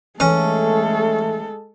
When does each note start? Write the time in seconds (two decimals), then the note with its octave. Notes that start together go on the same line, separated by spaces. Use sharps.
0.20 E3 G#3 A3 C#4 A4